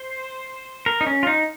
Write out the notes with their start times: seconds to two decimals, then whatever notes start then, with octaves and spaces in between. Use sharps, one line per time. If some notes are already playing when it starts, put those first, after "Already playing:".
Already playing: C5
0.86 A#4
1.01 D#4
1.07 C#4
1.23 F4
1.27 D#4